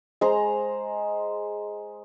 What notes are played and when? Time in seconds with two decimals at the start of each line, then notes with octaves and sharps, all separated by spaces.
0.21 G#3 C5 A#5